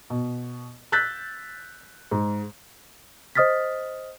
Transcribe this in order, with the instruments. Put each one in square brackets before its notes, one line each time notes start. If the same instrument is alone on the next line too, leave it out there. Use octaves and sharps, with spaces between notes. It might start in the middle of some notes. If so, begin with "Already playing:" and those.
[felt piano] B2
E6 F#6 G6 A6 B6
G#2
[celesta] C5 D#5 D#6 F6 A6 B6